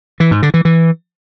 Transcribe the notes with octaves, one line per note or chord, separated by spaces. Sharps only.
E3
G#2
D3
E3
E3